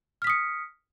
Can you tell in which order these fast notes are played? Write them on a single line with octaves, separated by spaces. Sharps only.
F6 B6 D#6 C#7